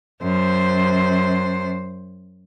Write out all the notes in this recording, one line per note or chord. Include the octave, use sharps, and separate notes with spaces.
F#2 C5